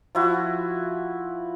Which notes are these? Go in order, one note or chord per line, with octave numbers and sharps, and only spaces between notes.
F3 E4 F#4